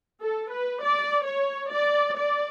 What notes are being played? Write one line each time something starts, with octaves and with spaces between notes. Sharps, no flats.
A4
B4
D5
C#5
D5
D5